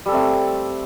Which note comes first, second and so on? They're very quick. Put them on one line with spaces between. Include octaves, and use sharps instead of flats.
G3 A4 C4 A3